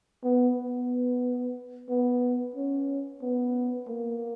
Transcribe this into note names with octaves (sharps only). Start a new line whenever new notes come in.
B3
B3
B3
C#4
B3
A#3